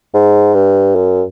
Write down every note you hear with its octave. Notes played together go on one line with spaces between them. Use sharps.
G#2
G2
F#2